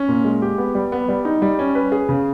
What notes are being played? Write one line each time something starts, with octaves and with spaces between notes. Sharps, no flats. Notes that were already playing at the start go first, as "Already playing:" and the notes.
Already playing: C#4
A#2
G#3
G4
B3
G3
B3
G3
D#4
G3
C#4
B4
G#4
C#3